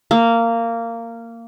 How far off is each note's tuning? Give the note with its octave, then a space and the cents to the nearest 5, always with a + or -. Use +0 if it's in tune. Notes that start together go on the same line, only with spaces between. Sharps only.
A#3 -15